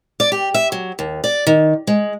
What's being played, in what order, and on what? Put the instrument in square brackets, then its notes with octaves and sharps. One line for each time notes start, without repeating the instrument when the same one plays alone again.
[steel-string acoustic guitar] D5
G4
E5
F#3
D#2
D5
D#3
G#3